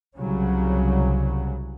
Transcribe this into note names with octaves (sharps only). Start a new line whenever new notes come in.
C2 C#3 F#3